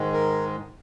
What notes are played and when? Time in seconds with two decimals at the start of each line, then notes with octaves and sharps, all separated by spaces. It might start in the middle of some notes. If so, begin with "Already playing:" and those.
Already playing: G#2 D#3 G#3
0.12 A#4